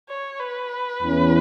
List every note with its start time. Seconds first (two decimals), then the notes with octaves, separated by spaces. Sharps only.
0.09 C#5
0.39 B4
1.01 E2 E3 C#4